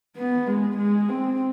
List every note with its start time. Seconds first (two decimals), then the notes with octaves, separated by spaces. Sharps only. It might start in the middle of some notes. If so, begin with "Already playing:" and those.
0.17 B3
0.47 G#3
0.77 G#3
1.09 C4